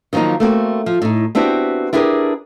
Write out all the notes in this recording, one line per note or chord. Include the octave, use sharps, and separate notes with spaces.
D#3 F3 F#3 A#3 D#4
A3 A#3 C4 F#4
F3
A2 D#4
B3 C4 D4 E4 F#4 G4
D4 E4 G4 G#4 A#4 B4